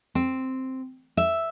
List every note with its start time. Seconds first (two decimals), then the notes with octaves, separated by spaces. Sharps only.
0.15 C4
1.17 E5